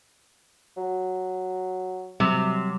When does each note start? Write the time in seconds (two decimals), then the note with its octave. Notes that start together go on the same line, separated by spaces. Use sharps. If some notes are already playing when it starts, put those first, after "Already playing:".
0.77 F#3
2.20 C3 F#3 G3